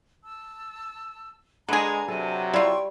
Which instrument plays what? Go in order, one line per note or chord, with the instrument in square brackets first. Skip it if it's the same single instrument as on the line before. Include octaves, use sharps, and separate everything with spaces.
[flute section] A5 E6
[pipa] D3 G#4 [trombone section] G#3 [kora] B4 [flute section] A#5
[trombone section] C3 F#3 [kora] A4 [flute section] G#5
[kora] G3 [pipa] E4 F4 [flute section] G5 C6 C#6